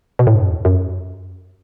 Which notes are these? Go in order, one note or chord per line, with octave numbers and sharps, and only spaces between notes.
B2
A2
G2
F#2
E2
F#2